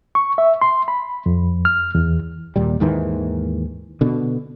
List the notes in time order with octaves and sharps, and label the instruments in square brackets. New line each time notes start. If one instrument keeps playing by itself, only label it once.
[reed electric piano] C#6
E5
C6
B5
F2
F6
E2
[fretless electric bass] D#2 A#2 G3
D#2 G#2 D#3 E3
B2 D3